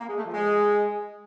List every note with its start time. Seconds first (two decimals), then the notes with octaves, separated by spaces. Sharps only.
0.01 A#3
0.09 G#3
0.17 A3
0.26 F3
0.34 G#3